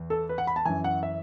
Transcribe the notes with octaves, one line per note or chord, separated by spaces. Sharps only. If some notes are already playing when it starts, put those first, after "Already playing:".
Already playing: E2
A4
B4
F#5
B5
A5
F#2 E3 G#5
F#5
E5